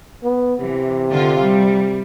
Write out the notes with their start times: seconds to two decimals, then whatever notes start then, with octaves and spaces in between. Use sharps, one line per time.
0.23 B3
0.60 C3 E3
1.11 D3 F4
1.42 G3